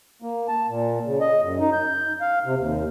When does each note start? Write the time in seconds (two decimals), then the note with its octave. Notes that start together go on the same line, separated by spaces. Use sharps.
0.22 A#3
0.48 A5
0.69 A#2
1.05 C#3
1.21 D#5
1.42 F#2
1.60 D#4
1.73 G6
2.21 F5
2.45 C3
2.58 D#2